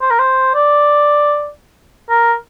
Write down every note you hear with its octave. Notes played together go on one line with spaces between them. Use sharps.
C5
A#4
C5
D5
A#4